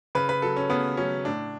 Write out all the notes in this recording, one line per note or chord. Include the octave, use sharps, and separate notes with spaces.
C#3 B4
B4
F#3 A4
C#4
C#3 B3
F#3 C#4
A2 D4